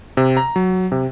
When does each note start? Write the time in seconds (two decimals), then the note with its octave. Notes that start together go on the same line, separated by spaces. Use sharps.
0.17 C3
0.37 A#5
0.56 F#3
0.92 C3